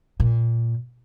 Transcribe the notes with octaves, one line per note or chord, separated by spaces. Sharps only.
A#2